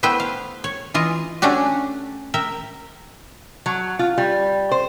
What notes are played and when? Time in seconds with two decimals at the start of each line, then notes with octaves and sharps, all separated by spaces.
0.03 A3 B3 E4 B4 C5 G5
0.20 F5
0.64 C#5
0.94 E3 F4 D#5
1.42 A3 C#4 D4 F#4 G4
2.34 A#4 E5 G5
3.66 F#3
3.99 F4
4.18 G3
4.71 C5